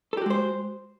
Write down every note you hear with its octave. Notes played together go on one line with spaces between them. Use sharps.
G#3 F#4 G4 A4 C5